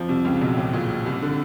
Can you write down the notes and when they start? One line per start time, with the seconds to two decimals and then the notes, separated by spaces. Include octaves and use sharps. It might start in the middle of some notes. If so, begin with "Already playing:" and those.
Already playing: F2 F3
0.09 C2 C3
0.25 C#2 C#3
0.41 B1 B2
0.57 A2
0.73 A#2
1.06 C2 C3
1.22 D3